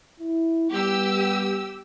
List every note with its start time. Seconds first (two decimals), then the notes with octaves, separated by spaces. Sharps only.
0.21 E4
0.72 G3 B3 G4 E6